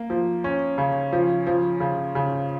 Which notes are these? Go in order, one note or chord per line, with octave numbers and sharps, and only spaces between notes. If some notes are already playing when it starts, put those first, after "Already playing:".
Already playing: A#3
F3
C#4
C#3
F3
F3
C#3
C#3